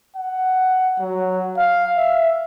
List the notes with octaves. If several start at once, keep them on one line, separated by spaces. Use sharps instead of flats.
F#5
F#3
F5
E5